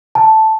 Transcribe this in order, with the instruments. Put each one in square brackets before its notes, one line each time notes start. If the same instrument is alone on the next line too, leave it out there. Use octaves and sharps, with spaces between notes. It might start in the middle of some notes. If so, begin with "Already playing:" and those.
[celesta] A5